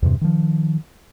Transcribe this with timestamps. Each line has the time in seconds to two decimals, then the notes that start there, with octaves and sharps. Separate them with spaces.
0.02 E2 G2 C3
0.21 D#3 F3